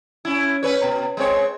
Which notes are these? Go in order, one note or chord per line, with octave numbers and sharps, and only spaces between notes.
C#4 E4
C#4 B4 C#5
B2
G#3 C4 C#5